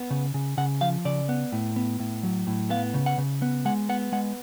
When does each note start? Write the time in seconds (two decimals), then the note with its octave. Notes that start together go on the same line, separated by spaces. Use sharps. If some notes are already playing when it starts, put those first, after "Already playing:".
Already playing: B3
0.10 C#3
0.34 C#3
0.57 C#3 F#5
0.81 F3 F5
1.05 C#3 D5
1.29 B3
1.52 A2
1.76 B3
2.00 A2
2.23 F#3
2.47 A2
2.70 B3 F5
2.94 C#3
3.06 F#5
3.18 C#3
3.42 B3
3.65 G#3 F#5
3.89 B3 F#5
4.12 G#3 F#5